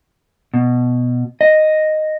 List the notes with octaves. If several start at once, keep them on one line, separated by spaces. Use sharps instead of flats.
B2
D#5